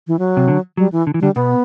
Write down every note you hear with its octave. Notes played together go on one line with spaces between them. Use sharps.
E3
F#3
C3
D3
F#3 G3
E3
D3
E3
D3 G3
B2 B3